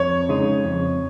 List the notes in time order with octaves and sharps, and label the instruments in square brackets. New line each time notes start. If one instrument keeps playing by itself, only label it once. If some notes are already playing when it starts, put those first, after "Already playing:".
Already playing: [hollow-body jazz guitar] F2 [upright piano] C#5
[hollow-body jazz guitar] C#3 G#3 D#4
F2